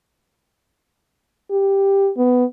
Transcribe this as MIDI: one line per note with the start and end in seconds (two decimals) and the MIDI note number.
1.51 2.10 67
2.17 2.45 59